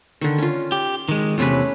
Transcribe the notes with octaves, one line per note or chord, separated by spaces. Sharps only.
D3 D#3
C#4 F4
G4
D#3 G#3
E2 C3 A3 C#4 B4